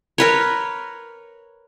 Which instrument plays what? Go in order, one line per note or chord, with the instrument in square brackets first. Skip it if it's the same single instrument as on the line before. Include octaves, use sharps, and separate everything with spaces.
[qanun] A#4 B4 C#5